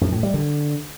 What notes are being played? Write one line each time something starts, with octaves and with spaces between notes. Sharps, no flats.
F#2
A2
G3
D3